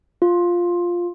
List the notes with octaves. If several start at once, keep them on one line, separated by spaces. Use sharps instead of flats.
F4